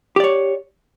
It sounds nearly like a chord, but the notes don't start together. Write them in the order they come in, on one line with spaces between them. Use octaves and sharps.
G4 D5 C#5